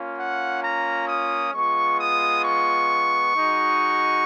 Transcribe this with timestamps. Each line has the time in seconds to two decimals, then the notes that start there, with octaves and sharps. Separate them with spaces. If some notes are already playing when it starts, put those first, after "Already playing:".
Already playing: A#3 C#4 F4
0.18 F#5
0.63 A#5
1.08 D#6
1.53 G#3 B3 F4 C#6
1.98 D#6
2.44 C#6
3.35 G#3 D#4 F#4